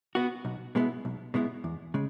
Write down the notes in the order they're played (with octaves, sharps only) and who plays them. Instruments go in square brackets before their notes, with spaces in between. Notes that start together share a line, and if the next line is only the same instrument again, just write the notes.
[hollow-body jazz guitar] B3 F#4
B1
B2 G#3 B3 E4
B1
B2 G#3 B3 E4
E2
C#3 G#3